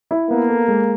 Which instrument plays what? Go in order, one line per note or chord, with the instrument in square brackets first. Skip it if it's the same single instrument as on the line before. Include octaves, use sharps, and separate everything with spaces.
[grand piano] E4
[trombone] A#3 [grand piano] B3
[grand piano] A4
G#3